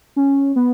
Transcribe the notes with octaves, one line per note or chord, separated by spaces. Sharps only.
C#4
B3